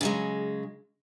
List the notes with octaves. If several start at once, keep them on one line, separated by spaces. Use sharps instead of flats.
C#3 F#3 G#3